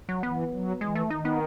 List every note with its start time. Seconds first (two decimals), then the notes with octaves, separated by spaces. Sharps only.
0.09 F#3
0.23 E3 B3
0.52 F#3
0.81 E3 G#3
0.95 A3
1.10 D#3 D#4
1.25 B3